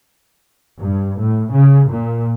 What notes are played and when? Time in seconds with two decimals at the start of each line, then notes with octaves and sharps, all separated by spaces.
0.78 G2
1.19 A2
1.52 C#3
1.89 A#2